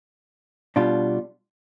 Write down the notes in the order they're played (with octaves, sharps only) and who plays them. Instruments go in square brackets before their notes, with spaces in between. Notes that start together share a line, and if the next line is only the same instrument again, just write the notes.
[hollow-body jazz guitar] B2 G3 D4 F4